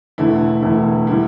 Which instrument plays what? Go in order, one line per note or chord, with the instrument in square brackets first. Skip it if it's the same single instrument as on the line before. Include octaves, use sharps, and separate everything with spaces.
[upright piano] E1 E2 D3 A3 E4
E1 E2 D3 A3 E4
D3 G3 E4